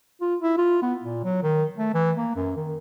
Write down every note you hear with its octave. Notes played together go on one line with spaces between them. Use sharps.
F4
E4
F4
B3
A#2
F#3
D#3
A3
E3
A#3
F#2
D#3